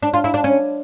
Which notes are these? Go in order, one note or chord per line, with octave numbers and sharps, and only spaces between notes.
D4
F4
E4
D4
C#4